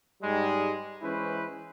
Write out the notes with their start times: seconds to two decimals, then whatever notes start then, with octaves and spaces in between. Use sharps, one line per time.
0.22 G#2 G3 G#3
1.01 E3 G#3 C#4 E4 B4 C5